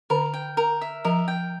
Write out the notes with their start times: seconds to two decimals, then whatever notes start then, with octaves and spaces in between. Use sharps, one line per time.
0.10 D3 A#4
0.34 G5
0.57 A#4
0.81 E5
1.04 F3 A#4
1.28 G5